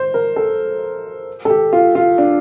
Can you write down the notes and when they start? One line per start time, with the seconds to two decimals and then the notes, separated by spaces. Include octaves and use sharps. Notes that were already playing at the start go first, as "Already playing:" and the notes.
Already playing: C5
0.14 A#4
0.36 A4
1.45 A4
1.50 G4
1.73 F4
1.95 F4
2.18 D4